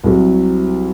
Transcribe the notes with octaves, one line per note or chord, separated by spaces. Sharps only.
C2 C3 F#3